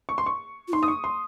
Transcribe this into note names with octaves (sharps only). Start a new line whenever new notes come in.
C#6
C6
C#6
F4
D#4 C6
D#6
C#6
C6